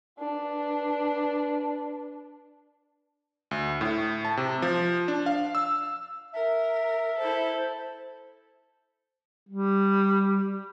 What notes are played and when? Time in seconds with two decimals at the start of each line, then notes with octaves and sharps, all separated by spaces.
0.19 D4 B4
3.51 D2
3.81 A2
4.25 A5
4.37 C3
4.62 F3
5.08 D4
5.26 F5
5.55 E6
6.34 A#4 E5
7.18 E4 A4 C5
9.49 G3